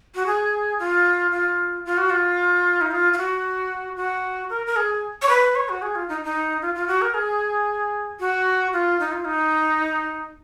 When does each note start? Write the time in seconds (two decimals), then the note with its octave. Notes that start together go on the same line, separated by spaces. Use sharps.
0.15 F#4
0.26 G#4
0.79 F4
1.32 F4
1.85 F4
1.98 F#4
2.10 F4
2.81 D#4
2.91 F4
3.13 F4
3.18 F#4
3.96 F#4
4.50 A#4
4.67 A#4
4.76 G#4
5.22 C#5
5.29 B4
5.55 C#5
5.69 F#4
5.82 G#4
5.95 F4
6.09 D#4
6.24 D#4
6.62 F4
6.75 F4
6.87 F#4
7.02 A#4
7.14 G#4
8.20 F#4
8.73 F4
9.00 D#4
9.12 F4
9.25 D#4